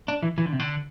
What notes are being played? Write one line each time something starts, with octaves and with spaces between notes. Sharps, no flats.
D4
E3
E3
D3
C3
D3